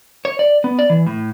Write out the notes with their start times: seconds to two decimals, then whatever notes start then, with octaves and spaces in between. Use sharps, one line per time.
0.25 C#5
0.39 D5
0.64 B3
0.79 D5
0.90 E3
1.07 A2